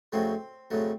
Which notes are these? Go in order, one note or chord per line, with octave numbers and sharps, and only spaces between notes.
F2 C#3 F#3 A3 C4
F2 C#3 F#3 A3